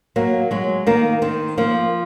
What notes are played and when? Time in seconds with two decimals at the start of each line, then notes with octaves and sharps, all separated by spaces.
0.16 F#3 A#3
0.51 F#3 G#3
0.86 D#3 A#3
1.22 D#3 C4
1.58 F3 A#3